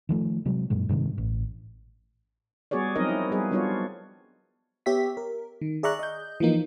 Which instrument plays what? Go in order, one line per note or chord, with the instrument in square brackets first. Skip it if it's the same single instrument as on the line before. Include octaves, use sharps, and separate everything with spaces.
[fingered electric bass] D#3 F3 A3
C3 F#3 G#3
F#2 A#2 G#3
G2 C3 D#3 G#3
A1
[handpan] G3 B3 F#4 G#4 C#5 D5
F3 F#3 C4 D#4 A#4 D#5
D#4 E4
G3 B3 G#4 B4 D#5
F#3 G3 B3 D4 F4 C#5
[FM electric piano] B3 G4 C#5 E5 B6
A#4
D#3
G#4 D5 E5 A#5 C#6 F#6
D#5 G6
E3 F3 A#3 D#4